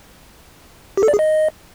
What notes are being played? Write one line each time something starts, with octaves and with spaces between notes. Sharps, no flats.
G4
A4
D5
G#4
D#5